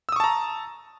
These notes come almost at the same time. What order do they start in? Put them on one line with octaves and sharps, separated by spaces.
E6 D#6 C#6 A5 A#5